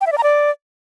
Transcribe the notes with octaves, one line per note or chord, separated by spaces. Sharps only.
G5
E5
D5
A#5
D5